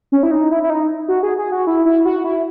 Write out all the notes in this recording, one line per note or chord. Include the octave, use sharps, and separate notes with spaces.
C#4
E4
D#4
E4
E4
D#4
F#4
G#4
G#4
F#4
E4
E4
F#4
E4